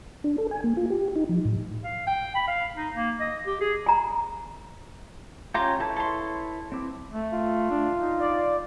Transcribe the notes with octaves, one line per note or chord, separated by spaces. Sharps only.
D4
A4
G#5
A#3
F4
G4
D#4
F3
A2
F5
G5
B5
F5
D#4
A#3
D#5
G4
G#4
G#5 A#5
C#4 F4 G4 G5 A#5
E4 A4 B4 C#5
A4 C6
C4 E4 D6
A3
F4
D4
D#4
D5